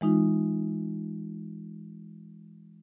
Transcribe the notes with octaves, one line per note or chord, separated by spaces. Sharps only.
E3 G#3 D#4 F4